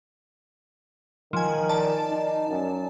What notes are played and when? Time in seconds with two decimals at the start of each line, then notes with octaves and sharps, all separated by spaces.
1.33 D#3 F3 G#5
1.69 D5 A5
2.10 D#4
2.50 F#2